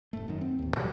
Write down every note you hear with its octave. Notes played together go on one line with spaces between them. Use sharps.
F1 G#2 A3
F#2 D#3
C4
A1 D#2
B2 E3 F#3 G3